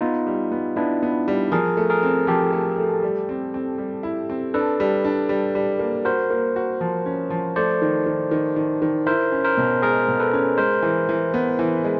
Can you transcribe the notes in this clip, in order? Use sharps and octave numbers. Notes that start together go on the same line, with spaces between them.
B3 D#4 F4
G3
B3
B3 D4 E4
B3
G3
F3 G#4 A#4
A3
G#4 A#4
C4
F3 G4 A4
A3
A3
G3
C4
C4
G3
E4
C4
D4 A4 B4
G3
D4
G3
G3
A#3
F#4 A#4 C5
A#3
F#4
F3
C#4
F3
A3 C5 D5
D#3
D#3
D#3
D#3
D#3
E4 A#4 C5
C#4
A#4 C5
B2
G#3 G#4 A#4
B2
A4 B4
C#4
G#3 A#4 C5
E3
E3
B3
E3
G#3